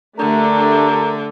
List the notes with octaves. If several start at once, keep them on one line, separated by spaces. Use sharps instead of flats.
D3 A3 D4 G4 A#4